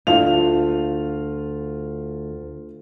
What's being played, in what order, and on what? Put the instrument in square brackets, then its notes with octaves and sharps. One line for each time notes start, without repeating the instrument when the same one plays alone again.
[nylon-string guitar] D2 [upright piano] F4 F7